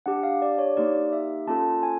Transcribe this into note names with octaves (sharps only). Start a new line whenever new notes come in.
D4 G4 F#5
F5
D5
C#5
A#3 D#4 G4 D5
E5
A#3 C#4 F4 A4 A5
G#5